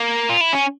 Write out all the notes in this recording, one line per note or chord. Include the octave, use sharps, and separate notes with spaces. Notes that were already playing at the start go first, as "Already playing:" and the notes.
Already playing: A#3
F4
E4
C#4